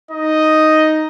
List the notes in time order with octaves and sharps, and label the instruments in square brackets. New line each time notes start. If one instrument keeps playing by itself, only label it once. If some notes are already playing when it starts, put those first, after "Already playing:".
[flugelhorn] D#4 [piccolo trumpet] D#5